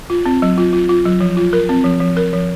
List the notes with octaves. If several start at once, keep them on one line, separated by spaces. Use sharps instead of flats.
F4
C4
F#3
F4
F4
F4
F#3
F3
F4
A#4
C4
F3
F3
A#4
F3